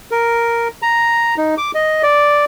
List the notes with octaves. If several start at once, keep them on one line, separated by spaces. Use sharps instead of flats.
A#4
A#5
D#4
D6
D#5
D5